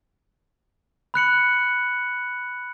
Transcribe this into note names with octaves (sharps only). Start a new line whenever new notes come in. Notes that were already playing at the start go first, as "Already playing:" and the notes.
B5 F#6 C#7 F#7